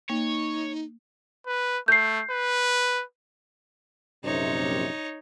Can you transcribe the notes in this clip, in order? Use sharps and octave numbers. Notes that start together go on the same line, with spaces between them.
A#3 D#4 C#5
B4
A3 G6 C7
B4
A#1 F#2 C3 D#4 C#5